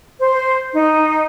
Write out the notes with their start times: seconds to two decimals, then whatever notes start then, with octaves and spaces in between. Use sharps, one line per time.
0.19 C5
0.74 D#4